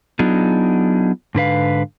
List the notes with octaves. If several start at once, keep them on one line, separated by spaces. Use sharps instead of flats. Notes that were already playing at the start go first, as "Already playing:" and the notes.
F#3 B3 D4 D#4 F4 G#4
G#2 D3 B4 F5